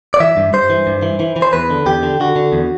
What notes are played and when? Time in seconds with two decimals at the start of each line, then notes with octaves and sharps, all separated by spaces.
0.14 D5
0.20 E3 E5
0.37 G2
0.53 G2 C5
0.70 E3
0.87 G2
1.03 E3
1.20 E3
1.36 E3
1.42 C5
1.53 E2 B4
1.70 D3
1.86 E2 G4
2.03 D3
2.20 D3 F#4
2.36 D3
2.53 E2